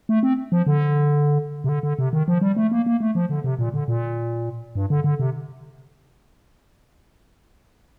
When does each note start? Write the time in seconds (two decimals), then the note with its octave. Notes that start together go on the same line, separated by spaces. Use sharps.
0.09 A3
0.23 C4
0.52 F3
0.67 D3
1.64 C3
1.69 D3
1.83 D3
1.99 C3
2.13 D#3
2.28 F3
2.41 G3
2.57 A3
2.72 A#3
2.86 A#3
3.01 A3
3.15 F3
3.29 D3
3.44 C3
3.59 A#2
3.74 D3
3.88 A#2
4.75 G2
4.90 D3
5.04 D3
5.19 C3